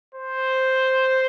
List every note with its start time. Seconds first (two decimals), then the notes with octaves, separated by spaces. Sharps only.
0.15 C5